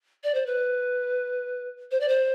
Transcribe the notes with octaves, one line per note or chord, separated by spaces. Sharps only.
D5
C5
B4
C5
D5
C5